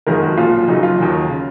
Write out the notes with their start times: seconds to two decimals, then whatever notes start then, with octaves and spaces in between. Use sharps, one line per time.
0.07 F#1 F2 D#3 G#3 A#4
0.22 F#4
0.37 B1 A#2 F3 F4
0.68 F#1 F#2 C#3 F#3 D#4
0.83 F4
0.99 D#2 D#3 F#3
1.29 C#3